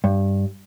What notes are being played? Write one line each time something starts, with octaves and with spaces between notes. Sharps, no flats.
G2